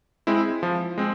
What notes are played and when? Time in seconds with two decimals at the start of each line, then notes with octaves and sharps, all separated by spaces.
0.27 G#3 C4 E4
0.63 F3
0.98 G#3 C4